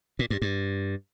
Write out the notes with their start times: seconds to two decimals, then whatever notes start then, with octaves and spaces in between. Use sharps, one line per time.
0.19 A#2
0.30 G2
0.42 G2